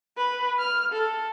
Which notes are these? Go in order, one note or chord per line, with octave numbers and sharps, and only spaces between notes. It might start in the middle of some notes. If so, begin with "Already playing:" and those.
B4
F6
A4